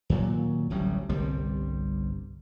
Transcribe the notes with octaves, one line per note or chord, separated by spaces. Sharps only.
D#2 A#2 F#3
D1 A1 F#3 G3
G1 C2 C3 G3